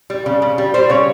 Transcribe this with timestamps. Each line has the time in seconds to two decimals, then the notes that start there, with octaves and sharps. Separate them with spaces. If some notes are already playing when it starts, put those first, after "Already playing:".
0.10 G3
0.26 C#3
0.42 C#3
0.58 G3
0.74 G3 C5
0.90 C#3 C#5